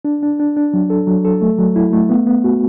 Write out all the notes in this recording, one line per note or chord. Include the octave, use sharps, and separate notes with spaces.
D4
D4
D4
D4
F#3
A4
F#3
A4
A3
F#3
E4
A3
B3
B3
F#4